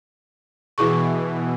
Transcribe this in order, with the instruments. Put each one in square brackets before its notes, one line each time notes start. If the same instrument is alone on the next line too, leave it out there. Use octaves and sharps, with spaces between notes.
[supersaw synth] B2 E3 [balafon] E4 G#4 C#6